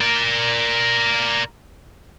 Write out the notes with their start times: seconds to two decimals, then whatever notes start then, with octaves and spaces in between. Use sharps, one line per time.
0.01 A#4 D5